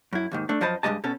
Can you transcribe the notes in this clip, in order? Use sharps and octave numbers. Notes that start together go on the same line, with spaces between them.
F#2 E4
D#2 G#2 D#3
A3 D4
F#2 F3 C5 D#5 A5 B5
G2 B2 G#3 G4 D#5 A5
B2 C#4 A4